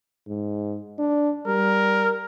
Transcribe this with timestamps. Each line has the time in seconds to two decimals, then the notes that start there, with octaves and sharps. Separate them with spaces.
0.27 G#2
0.98 D4
1.47 G3 A#4